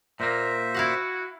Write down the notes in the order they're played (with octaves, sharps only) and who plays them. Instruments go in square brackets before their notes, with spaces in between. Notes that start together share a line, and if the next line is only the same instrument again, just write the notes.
[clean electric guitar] A#2 A#3 [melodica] C5 E5 [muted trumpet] A#5
[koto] E4 F5 F#5 [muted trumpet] F#4